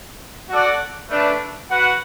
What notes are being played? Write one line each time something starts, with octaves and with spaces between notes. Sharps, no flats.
F#4 A4 D5 F#5
A3 D4 B4 D5
F#4 B4 F#5